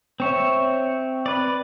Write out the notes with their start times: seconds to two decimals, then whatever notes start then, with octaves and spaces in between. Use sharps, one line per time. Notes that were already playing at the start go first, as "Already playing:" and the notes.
0.20 C4 C#5 E5
1.26 B4 D5